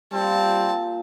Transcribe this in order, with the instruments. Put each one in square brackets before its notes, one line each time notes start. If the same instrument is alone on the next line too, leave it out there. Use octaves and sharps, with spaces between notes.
[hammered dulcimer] A#2 F4 [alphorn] G3 [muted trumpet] C4 [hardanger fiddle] A5